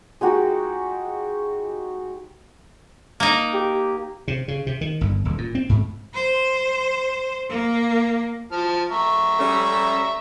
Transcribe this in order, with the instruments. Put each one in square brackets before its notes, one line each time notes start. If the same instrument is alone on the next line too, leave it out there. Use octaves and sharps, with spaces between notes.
[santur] G#3 D#4 F#4 G4
[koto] A#3 D#4
[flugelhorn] G4
[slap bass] C3
C#3
C3
D#3
G1
D#1
A#2
C4
G#2
[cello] C5
A#3
[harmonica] F3 A5 F6
E5 A#5 C#6
[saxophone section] G3 A3 C#4